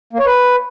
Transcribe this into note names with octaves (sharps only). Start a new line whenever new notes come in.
A#3
C#5
B4